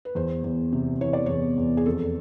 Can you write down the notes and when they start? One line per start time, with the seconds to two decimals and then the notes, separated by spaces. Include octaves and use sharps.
0.05 B4
0.15 E2 C5
0.44 E2
0.72 C3
1.01 E3 C#5
1.13 D5
1.26 E2 C#5
1.58 E2
1.77 G#4
1.86 F2 A4